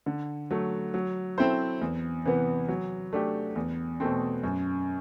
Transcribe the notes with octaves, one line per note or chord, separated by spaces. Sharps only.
D3
F#3 A3
F#3
C4 E4 A4 C5
E2
C3 E3 B3
F#3
A3 D4 G4
E2
B2 A3 C4
F#2